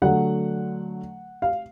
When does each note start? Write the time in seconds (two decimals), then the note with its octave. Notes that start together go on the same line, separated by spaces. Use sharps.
0.02 D3 F#3 A3 F#5
1.42 F5